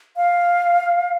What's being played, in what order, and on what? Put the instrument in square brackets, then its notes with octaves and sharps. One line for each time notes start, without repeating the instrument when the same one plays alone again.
[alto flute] F5